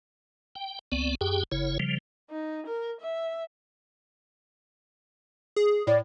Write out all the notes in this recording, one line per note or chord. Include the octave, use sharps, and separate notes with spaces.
G5
C#2 B3 C4 D5
F#2 G4 G#4 G5
F#1 C#3 E4 C#5
C#3 F3 G3
D#4
A#4
E5
G#4
A2 D5